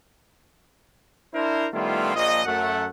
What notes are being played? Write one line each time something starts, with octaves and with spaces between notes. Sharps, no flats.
D4 E4 A#4 C5
D#3 G3 A3 B3 E4 F4
A#1 D#5
F#2 A3 F#5